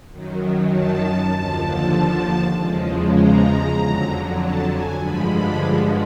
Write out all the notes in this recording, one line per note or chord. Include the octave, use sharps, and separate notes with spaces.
F#2 D#3 F#3
A5
D#2 D3 F3
E2 C#3 F3 G#3
A#5
F2 D3 F#3
A5
G#5
G2 D3 F3 G#3 B5
B5